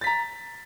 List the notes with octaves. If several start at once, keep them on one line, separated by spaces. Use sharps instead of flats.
A#5 A6 B6